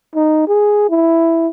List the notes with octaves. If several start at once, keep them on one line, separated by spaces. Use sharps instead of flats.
D#4
G#4
E4